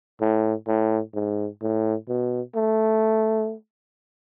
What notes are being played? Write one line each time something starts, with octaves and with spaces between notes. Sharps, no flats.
A2
A2
G#2
A2
B2
A3